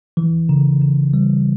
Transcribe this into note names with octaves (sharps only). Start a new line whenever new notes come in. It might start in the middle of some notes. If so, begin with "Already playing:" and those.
E3
C#3
C#3
G3